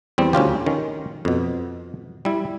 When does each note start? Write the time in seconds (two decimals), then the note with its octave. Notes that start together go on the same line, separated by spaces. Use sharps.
0.18 E2 G3 C4
0.33 D2 C#4 F4 G4
0.66 D#3 C#4
1.25 F2 B2
2.25 G3 E4